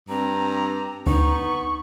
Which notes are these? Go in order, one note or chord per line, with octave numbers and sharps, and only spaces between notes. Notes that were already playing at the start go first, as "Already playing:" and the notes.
G2 C4 A#5
D2 B3 D#4 C#6